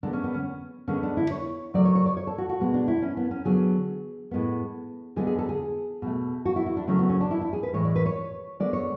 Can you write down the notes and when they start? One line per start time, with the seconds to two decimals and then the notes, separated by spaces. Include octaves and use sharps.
0.03 D3 G#3 B3 D4
0.13 C#4
0.24 B3
0.34 C#4
0.88 D3 G#3 B3 C#4
1.03 D4
1.17 E4
1.31 C#5
1.74 C#3 F#3 A3 D5
1.85 C#5
1.95 C#5
2.06 D5
2.17 C#5
2.27 A4
2.38 F#4
2.49 F#4
2.60 B2 G#3 B3
2.74 D4
2.88 E4
3.02 C#4
3.17 B3
3.31 C#4
3.45 D3 F#3 B3 G#4
4.31 A2 G#3 B3
5.16 D3 G#3 B3 G#4
5.27 G#4
5.39 A4
5.49 G#4
6.02 B2 A3
6.45 F#4
6.56 E4
6.66 E4
6.77 D4
6.87 C#3 F#3 A3 C#4
6.99 B3
7.09 C#4
7.20 D4
7.31 E4
7.41 E4
7.53 G#4
7.63 B4
7.73 A2 E3 G#3 C#5
7.85 D5
7.96 B4
8.06 C#5
8.60 D3 G#3 B3 D5
8.73 C#5